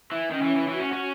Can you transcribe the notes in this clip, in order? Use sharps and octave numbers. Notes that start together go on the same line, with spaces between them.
E3
D#3 C#4
E3
E3
E3 F#4
C#4
C#4